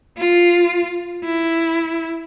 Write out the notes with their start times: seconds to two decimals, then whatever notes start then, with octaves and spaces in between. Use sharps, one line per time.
0.17 F4
1.24 E4